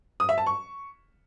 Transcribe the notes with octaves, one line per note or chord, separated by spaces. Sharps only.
D#6
E5
A5
C#6